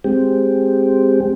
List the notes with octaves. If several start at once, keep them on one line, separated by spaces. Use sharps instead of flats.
G#3 C4 G4